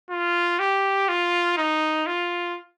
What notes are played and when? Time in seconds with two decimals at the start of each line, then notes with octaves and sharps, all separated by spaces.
0.10 F4
0.59 G4
1.09 F4
1.57 D#4
2.06 F4